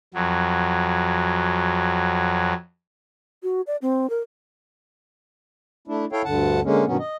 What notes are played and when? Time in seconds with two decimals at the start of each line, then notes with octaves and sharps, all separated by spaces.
0.14 F2 F#3
3.43 F#4
3.67 D5
3.82 C4
4.10 A#4
5.88 A3 D4 E4
6.12 E4 A4 C#5 F5 G5
6.25 D2 G2 D3 F#5 A5
6.64 D3 G#3 A#3 C#4
6.86 G2 B2 D#3 F#3 B3 C#4
6.99 D#5